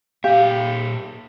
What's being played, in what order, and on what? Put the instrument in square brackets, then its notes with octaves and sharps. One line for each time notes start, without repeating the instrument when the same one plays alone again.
[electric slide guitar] A#2 E5 [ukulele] G4 [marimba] F5